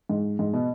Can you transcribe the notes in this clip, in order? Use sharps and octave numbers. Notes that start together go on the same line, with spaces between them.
G#2
G#2
B2